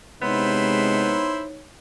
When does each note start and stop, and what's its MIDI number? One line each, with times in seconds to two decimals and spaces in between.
0.22 1.22 48
0.22 1.22 56
0.22 1.35 59
0.22 1.68 63
0.22 1.44 64
0.22 1.44 72
0.22 1.68 73